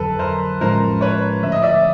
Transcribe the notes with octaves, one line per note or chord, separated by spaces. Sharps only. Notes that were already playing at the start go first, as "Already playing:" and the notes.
Already playing: F2 D3 F#3 A4 B4
A#4 C5
A2 F3 G#3 C#4 F4 A#4 C5
B4 C#5
D3 F3 A3 E5
D#5
D5 E5